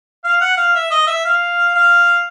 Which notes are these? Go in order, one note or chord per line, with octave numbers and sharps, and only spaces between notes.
F5
F#5
F5
E5
D#5
E5
F5
F5